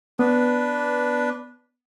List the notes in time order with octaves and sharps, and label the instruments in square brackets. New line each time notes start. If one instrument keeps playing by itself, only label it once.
[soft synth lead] B3 [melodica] D4 B4